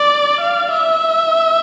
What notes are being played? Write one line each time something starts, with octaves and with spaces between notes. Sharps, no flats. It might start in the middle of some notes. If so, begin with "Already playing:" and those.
Already playing: D5
F5
E5